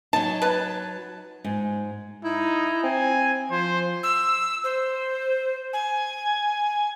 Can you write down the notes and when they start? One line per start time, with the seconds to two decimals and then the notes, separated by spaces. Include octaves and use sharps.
0.13 F#3 D#4 A5
0.42 B4 A5
1.45 G#2
2.24 D#4 E4
2.83 C4 G#5
3.51 F3 C5
4.03 E6
4.64 C5
5.73 G#5